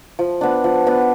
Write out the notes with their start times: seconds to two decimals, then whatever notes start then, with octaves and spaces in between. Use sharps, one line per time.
0.19 F3
0.41 B3 D4
0.64 F3
0.87 B3 D4